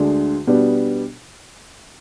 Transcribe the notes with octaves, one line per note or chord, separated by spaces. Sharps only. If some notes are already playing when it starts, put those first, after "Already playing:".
Already playing: D2 D3 G#3 D4
B2 G3 B3 D4